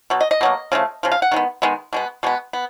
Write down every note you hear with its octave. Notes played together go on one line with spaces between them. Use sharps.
B2 F#3
D#5
D#5
B2 F#3 A#3
C#3 F3 A3
C#3 F3
F5
F#5
D#3 G#3 B3
D#3 G#3 B3
B2 G#3 B3
B2 G#3 B3
B3